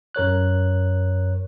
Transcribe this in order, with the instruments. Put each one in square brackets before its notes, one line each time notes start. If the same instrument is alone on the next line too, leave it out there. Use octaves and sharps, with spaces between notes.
[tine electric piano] F#2 A#4 C#5 F#6